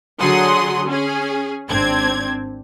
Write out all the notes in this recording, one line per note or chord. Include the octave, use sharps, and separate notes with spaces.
D3 F#3 G#4 F#5 C6 D#6
C#4 G#4
G#1 C4 D4 G#6